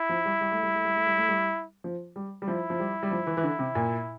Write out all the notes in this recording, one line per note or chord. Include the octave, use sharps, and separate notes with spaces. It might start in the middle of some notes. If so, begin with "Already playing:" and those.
Already playing: E4
F3
G3
G3
A3
G3
A3
G3
A3
G3
A3
G3
F3
G3
G3
F3 E4
F3
G3
G3
F3
E3
E3
D3
C3
A#2